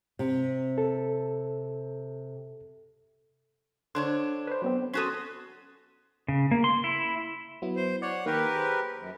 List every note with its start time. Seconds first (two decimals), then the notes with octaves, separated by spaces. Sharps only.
0.19 C3
0.78 A4
3.95 D3 D4 C5 C#5
4.47 B4 C5
4.62 F#3 B3 C4
4.93 C#4 F#4 A4 C6 D#6
6.28 C#3
6.51 A#3
6.64 C6
6.84 E4
7.62 F#3 B3 E4
7.76 C5
8.02 C#5 D5 F#5
8.26 D#3 A#3 G4 A#4 B4
8.56 G#4 C5
8.99 F#2